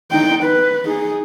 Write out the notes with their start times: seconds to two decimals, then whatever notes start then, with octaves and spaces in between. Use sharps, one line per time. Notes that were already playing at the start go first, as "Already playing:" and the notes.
0.12 D#4 G5
0.44 B4
0.86 D#4 G#4